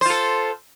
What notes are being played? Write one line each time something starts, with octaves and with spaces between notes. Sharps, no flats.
F4 A4 C5